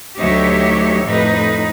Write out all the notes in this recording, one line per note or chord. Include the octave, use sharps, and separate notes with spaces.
D2 F#3 D#4 G4 C#5 E5
F2 A2 D#4 B4